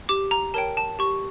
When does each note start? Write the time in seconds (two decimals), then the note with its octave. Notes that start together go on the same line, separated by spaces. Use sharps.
0.09 G4 D6
0.31 A#5
0.54 A#4 C#5 G5 A5
0.77 A5
0.99 G4 C#6